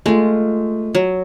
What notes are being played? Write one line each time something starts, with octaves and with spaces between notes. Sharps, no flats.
G#3 A3 F4
F#3